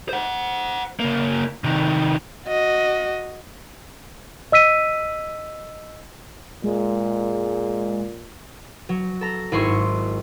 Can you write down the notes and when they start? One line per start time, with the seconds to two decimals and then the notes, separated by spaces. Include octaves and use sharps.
0.09 C5 F#5
1.00 C#3 A#3
1.64 C3 D#3
2.48 F#4 D#5
4.52 D#5 E6 B6 D#7
6.64 A#2 G#3
8.89 F#3
9.21 A4 A#5
9.52 G#1 E4 G#4 C6 C#6
9.68 G#2